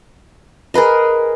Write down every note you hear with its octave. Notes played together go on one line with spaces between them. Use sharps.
G#4 A#4 B4 D#5